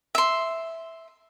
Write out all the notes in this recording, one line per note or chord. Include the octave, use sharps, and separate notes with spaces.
E5 C6